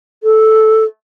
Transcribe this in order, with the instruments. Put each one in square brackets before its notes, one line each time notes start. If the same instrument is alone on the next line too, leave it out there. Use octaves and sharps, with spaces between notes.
[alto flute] A4